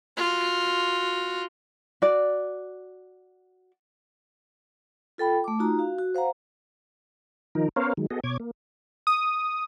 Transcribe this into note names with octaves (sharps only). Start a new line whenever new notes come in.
F4 F#4
F#4 D5
F4 A4 G5 B5
A3 D6
D#4 F4 F#4 A#5
F#4 F5
F#4
C5 F5 F#5 A#5
D#3 F3 D#4 A#4
B3 C#4 A#4 C5 C#5 F5
D#3 F#3 G#3
B3 F#4 G#4 A4 D#5
B2 C#5 D6 G#6
A#3
D#6